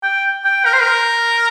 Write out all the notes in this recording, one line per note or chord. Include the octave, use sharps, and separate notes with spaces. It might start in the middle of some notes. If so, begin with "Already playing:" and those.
G5
G5
A#4
C5
A#4